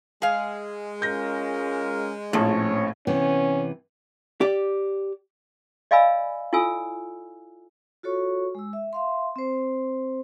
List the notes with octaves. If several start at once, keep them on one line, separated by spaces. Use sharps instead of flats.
G#3 G#4 F5
C#4 F4 A#4 G6 A#6
A#1 A2 F3 C4 C#4 C#5 A5
C3 E3 B3 C#4
G4 D5
D5 D#5 F5 G#5 B5 E6
E4 F4 A4 G#5 E6
F4 F#4 A4 C#5 C#6
G#3 E6
E5
E5 F5 C6
C4 C5